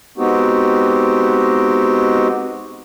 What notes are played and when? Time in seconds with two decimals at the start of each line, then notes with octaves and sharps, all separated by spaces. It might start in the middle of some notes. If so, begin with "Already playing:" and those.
0.18 G#3 B3 C4 D#4 F#4 G4